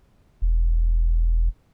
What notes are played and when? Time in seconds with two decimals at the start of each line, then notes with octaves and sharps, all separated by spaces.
0.42 E1